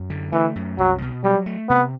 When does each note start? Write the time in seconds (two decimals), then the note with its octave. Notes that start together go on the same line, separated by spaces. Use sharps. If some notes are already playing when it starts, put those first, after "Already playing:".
Already playing: F#2
0.10 D3
0.32 E3 A3
0.56 F#2
0.78 C2 F#3
1.02 B2
1.24 F#3 G3
1.46 A3
1.69 C3 B3